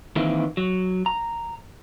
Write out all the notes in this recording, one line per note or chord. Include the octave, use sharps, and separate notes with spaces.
D#3 E3 A#3 C4 E4
F#3
A#5